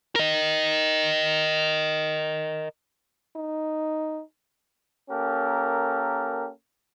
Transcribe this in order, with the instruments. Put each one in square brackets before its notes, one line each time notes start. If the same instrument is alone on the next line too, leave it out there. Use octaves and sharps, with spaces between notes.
[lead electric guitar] A#4 D#5
[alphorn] D#4
[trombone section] A#3 C#4 G4 A4 A#4